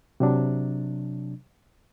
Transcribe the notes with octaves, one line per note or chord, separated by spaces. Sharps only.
C3 F#3 D4